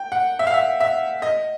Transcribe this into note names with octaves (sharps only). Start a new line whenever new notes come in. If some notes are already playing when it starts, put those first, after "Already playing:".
Already playing: G5
F#5
E5
F5
E5
E5
D#5